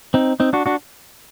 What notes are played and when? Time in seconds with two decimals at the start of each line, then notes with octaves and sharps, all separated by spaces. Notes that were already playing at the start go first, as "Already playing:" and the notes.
0.14 C4 D#4
0.40 C4 D#4
0.53 D4 F#4
0.66 D4 F#4